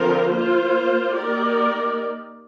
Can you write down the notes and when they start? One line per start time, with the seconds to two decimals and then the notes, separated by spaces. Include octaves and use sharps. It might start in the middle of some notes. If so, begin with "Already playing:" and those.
Already playing: D3 F3 C4 F4 A#4
0.31 A#3 F4 C5
1.16 A#3 D#4 G4 A#4 D5